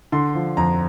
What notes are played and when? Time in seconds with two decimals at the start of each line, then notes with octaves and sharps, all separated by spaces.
0.12 D3 C6
0.35 F3
0.57 F2 A#5